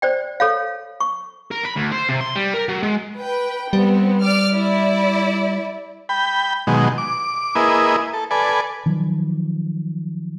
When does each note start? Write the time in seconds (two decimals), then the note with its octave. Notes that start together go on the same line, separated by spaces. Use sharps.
0.02 C5 D5 G5
0.40 A4 C#5 F5
1.00 C#6
1.51 A#4
1.65 B5
1.77 D2
1.92 C5
2.09 C3
2.21 C6
2.35 G3
2.54 A#4
2.68 F#3
2.83 G#3
3.19 B4 G5
3.73 G3 B3 C4
4.23 D5 D6 F6
4.53 E4 D5
6.09 G5 B5
6.67 B2 D#3 F#3 G#3
6.98 D6
7.55 A#3 E4 G#4 B4 D#5
8.14 A4
8.31 A4 B4 D5 G#5
8.86 D#3 F3 F#3